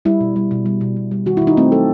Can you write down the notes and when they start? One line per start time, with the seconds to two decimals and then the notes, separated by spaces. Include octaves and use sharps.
0.05 G3 E4
0.21 B2
0.36 G3
0.51 B2
0.66 G3
0.81 B2
0.96 B2
1.11 G3
1.26 D#3 F#4
1.37 E4
1.42 D#3
1.47 D#4
1.57 A3 C4
1.72 F#3 A4